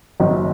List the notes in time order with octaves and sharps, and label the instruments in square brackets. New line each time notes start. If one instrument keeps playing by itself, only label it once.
[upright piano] F#1 F#2 D#3 F#3